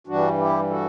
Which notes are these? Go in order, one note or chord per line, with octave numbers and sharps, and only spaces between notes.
G2 E3 G3 D4 F#4
E4 G4
F#4 A4